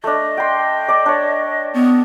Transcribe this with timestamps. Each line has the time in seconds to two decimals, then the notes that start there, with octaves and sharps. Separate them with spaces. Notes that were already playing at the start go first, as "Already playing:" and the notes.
0.04 A3 D4 D#5
0.37 G5 C6
0.88 D5 A5 D6
1.06 D4 C#5
1.74 B3